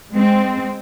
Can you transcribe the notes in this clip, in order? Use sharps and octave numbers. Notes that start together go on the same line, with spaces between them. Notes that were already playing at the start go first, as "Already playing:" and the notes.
G#3 C4